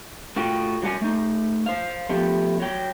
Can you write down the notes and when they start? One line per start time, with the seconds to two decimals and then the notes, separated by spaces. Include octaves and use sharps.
0.36 A2 F4 F#4 G5
0.82 F#3 G3 F#4 C5 F#5 G#5
1.02 A3 D#4
1.66 C5 F5
2.09 F3 A3 B3 G4
2.60 F#3 G5